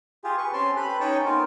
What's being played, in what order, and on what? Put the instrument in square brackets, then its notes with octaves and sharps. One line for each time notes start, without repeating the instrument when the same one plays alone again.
[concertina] F4 G4 G#4
B4 C#6
C4 C#4 G4 A5 C6
G4 A4 B4 B5 F#6
C#4 D#4 C#5 G5 A5
B3 C4 D#4 F4 A#4